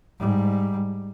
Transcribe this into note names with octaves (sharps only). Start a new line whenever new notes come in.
G#2 G3